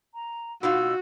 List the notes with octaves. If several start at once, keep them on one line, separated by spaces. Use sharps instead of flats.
A#5
B2 D#4 F4 F#4 E6